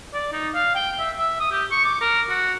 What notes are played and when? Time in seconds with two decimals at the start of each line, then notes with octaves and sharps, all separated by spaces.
0.14 D5
0.32 D#4
0.54 F5
0.76 G5
0.99 E5
1.18 E5
1.40 D#6
1.52 G4
1.71 C#6
1.84 D6
2.01 A#4
2.30 F#4